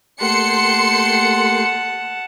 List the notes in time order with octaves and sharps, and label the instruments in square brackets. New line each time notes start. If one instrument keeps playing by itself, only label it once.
[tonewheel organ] A3 A#3 G4 [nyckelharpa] F#5 A5 [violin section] C6 C#7